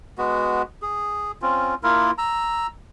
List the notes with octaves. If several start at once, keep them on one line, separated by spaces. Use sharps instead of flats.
G#3 B3 F#4
G#4
C4 C#4 F4
A#3 E4 F4 A#4
A#5 E6